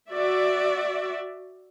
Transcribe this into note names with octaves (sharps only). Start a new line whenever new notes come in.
F#4 D5 E5